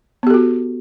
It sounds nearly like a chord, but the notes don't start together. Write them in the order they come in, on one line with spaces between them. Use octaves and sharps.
B3 G4 A4 F#4